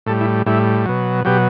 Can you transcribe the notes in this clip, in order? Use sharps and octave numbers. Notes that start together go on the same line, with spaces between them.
A2 G3 A4
E4
A2 G3 E4
B2 F#3
B2 F#3 G4